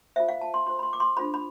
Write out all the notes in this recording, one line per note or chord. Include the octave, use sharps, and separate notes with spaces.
F4 A4 C5 E5
F5
A5
C6
F4 A4 C5 C6
B5
C6
D6
C6
D4 F4 A4 C5 B5
B5